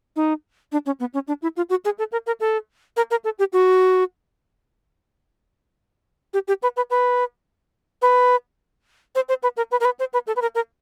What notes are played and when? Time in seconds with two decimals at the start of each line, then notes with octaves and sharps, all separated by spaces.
0.16 D#4
0.72 D4
0.86 C#4
1.00 B3
1.14 C#4
1.28 D4
1.42 E4
1.57 F4
1.70 F#4
1.85 G#4
1.98 A4
2.12 A#4
2.27 A#4
2.40 A4
2.97 A#4
3.11 A#4
3.24 A4
3.39 G4
3.53 F#4
6.34 G4
6.48 G4
6.63 B4
6.77 B4
6.90 B4
8.02 B4
9.15 C5
9.29 C5
9.43 B4
9.57 A#4
9.71 B4
9.80 A#4
9.85 B4
9.99 C5
10.13 B4
10.27 A4
10.36 B4
10.42 A#4
10.55 A#4